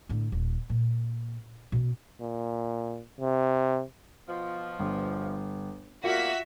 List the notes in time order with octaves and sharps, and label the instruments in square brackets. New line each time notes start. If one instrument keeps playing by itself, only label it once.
[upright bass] A2 D3
D#1
A#2
B2 C#4
[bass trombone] A#2
C3
[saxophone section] B2 F3
[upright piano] G1
[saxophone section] E2 G3 A#3 [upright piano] F4 [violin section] F#4 E5 B6